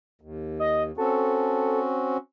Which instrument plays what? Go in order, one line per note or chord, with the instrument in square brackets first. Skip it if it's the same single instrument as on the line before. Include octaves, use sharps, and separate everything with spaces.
[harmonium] D#2
[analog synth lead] D#5
[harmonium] C4 C#4 F#4 [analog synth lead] A4